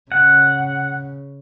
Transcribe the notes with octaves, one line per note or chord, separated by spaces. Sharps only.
C#3 F#5